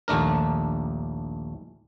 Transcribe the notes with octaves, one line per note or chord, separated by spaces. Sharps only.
A#1 D#2 A3 D4 A#4